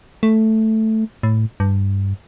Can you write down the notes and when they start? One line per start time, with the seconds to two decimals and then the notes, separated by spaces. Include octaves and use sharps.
0.23 A3
1.23 A2
1.60 G2